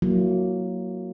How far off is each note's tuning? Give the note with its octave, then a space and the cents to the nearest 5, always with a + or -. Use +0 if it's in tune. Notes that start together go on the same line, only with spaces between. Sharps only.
F#3 -5 A#3 +0 E4 +25